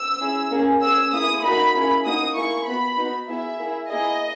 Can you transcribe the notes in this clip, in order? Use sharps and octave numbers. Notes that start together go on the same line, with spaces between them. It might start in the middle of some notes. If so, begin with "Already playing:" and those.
Already playing: E6
C#4 E4 G#4
A#3 C#4 G#4
C#4 G#4 E6
A#3 E4 G#4 D#6
A#3 D#4 F#4 B5
A#3 C#4 E4 G#4
A#3 D#4 F#4 D#6
A#3 E4 G#4 C#6
B3 F#4 B5
B3 D#4 F#4
B3 E4 G#4 E5
A#3 E4 G#4
A#3 E4 G#4 D#5